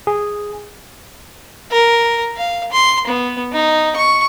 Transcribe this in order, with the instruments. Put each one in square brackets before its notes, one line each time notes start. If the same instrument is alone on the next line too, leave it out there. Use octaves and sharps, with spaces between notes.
[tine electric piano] G#4
[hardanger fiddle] A#4
F5
C6
B3
D#4
C#6